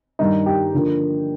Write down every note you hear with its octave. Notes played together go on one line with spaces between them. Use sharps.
G2 D#3 G3 D#4
G4
D3 F3 A#3